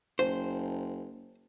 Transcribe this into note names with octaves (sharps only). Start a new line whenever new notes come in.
F#1 C5